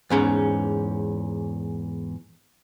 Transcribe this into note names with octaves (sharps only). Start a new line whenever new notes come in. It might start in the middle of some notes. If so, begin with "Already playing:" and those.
E2 G#2 C#4